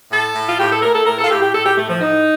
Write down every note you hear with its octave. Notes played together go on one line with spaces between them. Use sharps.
A2 A4
A2
F4
A2 G4
A4
A2 A#4
A4
A2 A#4
A4
F4
A2 G4
G4
A2 A4
G4
A2 A3
F3
A2 D#4